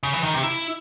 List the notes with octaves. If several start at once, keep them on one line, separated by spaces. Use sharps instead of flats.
C#3
E3
D#3
C3
E4